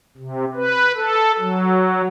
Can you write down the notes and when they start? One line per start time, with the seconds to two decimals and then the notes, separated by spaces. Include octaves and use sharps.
0.18 C3
0.55 B4
0.95 A4
1.38 F#3